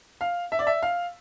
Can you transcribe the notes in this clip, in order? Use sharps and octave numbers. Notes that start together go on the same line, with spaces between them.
F5
E5
D5
E5
F5